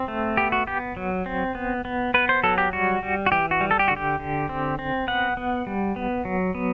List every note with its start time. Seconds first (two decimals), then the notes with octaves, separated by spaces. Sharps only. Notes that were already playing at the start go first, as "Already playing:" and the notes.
Already playing: C4
0.08 A3
0.37 B3 G4
0.52 F#4
0.67 B3 G4
0.97 F#3
1.26 C4
1.55 B3
1.85 B3
2.14 B3 B4
2.29 C5
2.43 F#3 A4
2.58 G4
2.73 G3 F#4
3.03 G3
3.26 F#4
3.32 E3 G4
3.51 F#4
3.61 G3
3.71 A4
3.79 G4
3.88 D3 F#4
3.96 G4
4.20 D3
4.49 C4
4.79 C4
5.08 B3 F#5
5.37 B3
5.67 G3
5.96 B3
6.25 F#3
6.55 B3